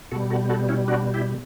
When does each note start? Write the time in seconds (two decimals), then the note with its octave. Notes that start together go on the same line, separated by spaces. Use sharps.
0.11 B2 G3 F#4 A4
0.30 F#4 A4
0.49 F#4 A4
0.69 C#4 E4
0.88 D4 F#4
1.14 E4 G4